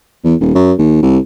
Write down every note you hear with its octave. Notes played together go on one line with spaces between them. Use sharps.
E2
D#1
F#2
D#2
C2